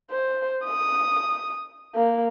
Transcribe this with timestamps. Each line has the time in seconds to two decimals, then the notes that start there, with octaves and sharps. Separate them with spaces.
0.11 C5
0.65 D#6
1.95 A#3